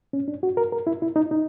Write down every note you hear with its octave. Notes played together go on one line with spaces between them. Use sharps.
C#4
D4
F#4
A#4
A#4
E4
E4
D#4
D#4